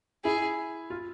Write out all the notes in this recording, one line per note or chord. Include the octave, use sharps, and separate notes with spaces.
E4 G#4
F4